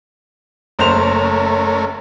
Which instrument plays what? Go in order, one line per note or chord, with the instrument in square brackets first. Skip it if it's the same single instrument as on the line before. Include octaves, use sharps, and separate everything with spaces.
[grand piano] F#1 C5 F7 [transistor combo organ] A3 C#4 A#4